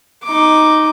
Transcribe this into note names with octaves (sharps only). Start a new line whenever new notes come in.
D#4 D6